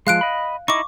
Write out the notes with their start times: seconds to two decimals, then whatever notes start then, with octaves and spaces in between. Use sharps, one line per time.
0.07 F3 G#3 F5 F#6 D7
0.21 D#5 B5
0.68 D#4 E4 D#5 C#6 D6